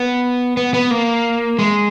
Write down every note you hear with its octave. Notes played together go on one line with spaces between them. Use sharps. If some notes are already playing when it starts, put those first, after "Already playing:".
Already playing: B3
B3
B3
A#3
G#3